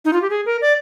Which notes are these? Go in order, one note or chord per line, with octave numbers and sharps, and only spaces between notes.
D#4
F4
G4
G#4
A#4
D5